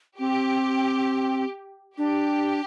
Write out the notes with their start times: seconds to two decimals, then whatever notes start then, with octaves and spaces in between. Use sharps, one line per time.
0.19 C4 G4
1.98 D4 G4